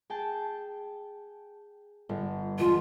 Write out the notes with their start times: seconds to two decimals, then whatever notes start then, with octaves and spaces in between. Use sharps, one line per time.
0.10 G#4 G5 A5
2.09 G1
2.59 E1 F4